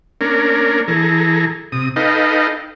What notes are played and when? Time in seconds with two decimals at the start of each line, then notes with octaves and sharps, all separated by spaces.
0.21 A#3 C#4 D4 A#4
0.88 E3 G#4 A4 A#5
1.72 C3 D#6
1.96 D#4 A4 B4 D#5 F5 G5